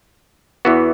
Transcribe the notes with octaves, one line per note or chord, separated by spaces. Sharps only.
E2 E3 B3 F#4